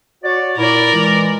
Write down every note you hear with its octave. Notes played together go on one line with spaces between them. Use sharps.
F#4 C#5 D5
A#2 E4 A#4 D5
E3 G#3